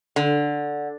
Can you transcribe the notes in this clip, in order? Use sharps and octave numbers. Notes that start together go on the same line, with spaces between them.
D3